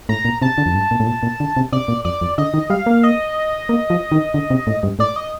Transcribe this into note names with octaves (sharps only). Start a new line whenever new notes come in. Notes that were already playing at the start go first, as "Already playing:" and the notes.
A2 A#5
A#2
C3 A5
D3
F2
G2
A#2
A2
A#2
A#2
D3
C3
C3 D5
A#2
F2 D5
F2
D3 D#5
D#3
G3 F5
A#3
D#5
A#3
F3
D#3
D3
C3
A2
G2
A2 D5
D#5